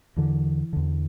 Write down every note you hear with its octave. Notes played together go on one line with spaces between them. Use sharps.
E2 D3 E3
E2 D3